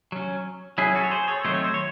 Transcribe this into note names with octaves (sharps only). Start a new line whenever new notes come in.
F#3 C#4
F#3 C#4 E4 G#4
F#4 A4
C#5
G#4 C5
A4 C#5
D#3 F#3 A3 C4 D#4 C5
C#5
C5
C#5